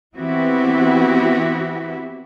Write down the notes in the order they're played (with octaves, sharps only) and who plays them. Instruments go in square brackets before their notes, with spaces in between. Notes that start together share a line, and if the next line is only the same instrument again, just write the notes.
[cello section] E3 B3 C4 E4 F#4 G4